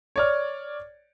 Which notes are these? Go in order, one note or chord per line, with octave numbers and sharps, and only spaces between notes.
C#5 D5 F6